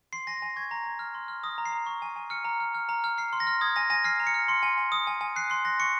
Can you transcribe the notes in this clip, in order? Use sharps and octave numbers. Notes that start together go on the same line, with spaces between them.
C6 C7
G#5 A#6
C7
G#5 A#6
C#6 G#6
A#5 A#6
A#5 G#6
F6
C6
F6
D#6 A#6
A#5
C7
A#5
C#6
G#5
G#5
F6 C#7
A#5
F6
F6
A#5
F6
F6 C7
C6
A#6
F6
D#6 G#6
G#5 A#6
G#5 A#6
F6 C7
A#5
C#7
F6
C6 C#7
G#5
G#5
D#6
G#5
G#5
F#6 C7
C6 C7
F#6 A#6
C#6 C#7